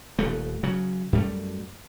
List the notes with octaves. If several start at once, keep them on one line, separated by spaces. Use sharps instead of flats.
D#1 D#2 A3
C#3 F#3
F#2 G3 A3